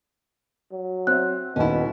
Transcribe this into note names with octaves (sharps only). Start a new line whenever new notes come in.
F#3
C4 E5 F#6
D#1 D#2 B2 C#4 E4